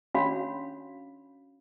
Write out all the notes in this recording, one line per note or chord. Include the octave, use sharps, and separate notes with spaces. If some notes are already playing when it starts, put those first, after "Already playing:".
C#4 D4 F#4 C#5 F5 B5